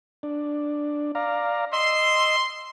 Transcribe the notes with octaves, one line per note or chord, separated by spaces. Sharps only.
D4
D5 F5 A#5
D#5 C6 E6